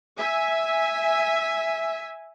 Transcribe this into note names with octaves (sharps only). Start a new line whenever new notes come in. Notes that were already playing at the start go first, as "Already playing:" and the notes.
E5 G#5